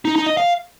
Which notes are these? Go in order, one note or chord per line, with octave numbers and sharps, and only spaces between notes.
D#4
D#4
D#5
F5